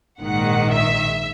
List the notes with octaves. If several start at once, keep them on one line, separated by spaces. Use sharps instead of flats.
A#1 G#2 D#3 F#5
E5